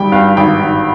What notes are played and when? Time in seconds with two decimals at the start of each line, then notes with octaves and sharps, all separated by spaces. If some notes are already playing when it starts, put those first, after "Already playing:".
Already playing: G#1 G3 G5
0.12 G2 F5
0.37 G#1 G5
0.62 G#1